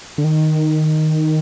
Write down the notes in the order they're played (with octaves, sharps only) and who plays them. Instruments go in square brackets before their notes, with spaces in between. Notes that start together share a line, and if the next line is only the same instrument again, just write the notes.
[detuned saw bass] D3
D#3